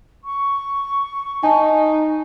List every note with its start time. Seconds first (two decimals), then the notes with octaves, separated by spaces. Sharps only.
0.24 C#6
1.43 D#4 G#5 A5